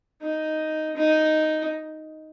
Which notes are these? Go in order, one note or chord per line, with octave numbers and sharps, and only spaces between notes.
D#4
D#4